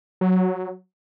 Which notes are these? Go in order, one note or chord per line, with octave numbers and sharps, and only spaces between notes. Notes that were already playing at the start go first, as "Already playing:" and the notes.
F#3